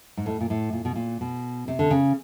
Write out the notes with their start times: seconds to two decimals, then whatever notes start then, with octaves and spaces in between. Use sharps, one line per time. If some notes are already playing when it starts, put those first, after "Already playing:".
0.17 G#2
0.26 A2
0.41 A#2
0.50 A2
0.73 A#2
0.85 B2
0.96 A#2
1.21 B2
1.68 C3
1.79 D3
1.90 C#3